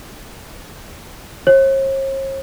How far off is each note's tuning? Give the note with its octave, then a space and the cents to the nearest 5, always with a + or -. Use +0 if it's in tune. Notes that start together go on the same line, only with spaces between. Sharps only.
C#5 -45